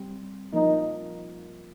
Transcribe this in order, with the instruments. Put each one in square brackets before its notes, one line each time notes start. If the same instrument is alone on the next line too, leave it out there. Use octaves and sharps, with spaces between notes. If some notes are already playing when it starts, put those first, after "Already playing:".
Already playing: [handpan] G3 C4
[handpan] F3 A#3 [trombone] D#4